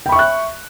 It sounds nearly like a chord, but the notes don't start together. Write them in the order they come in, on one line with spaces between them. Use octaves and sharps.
G5 B5 C#6 E5 F#6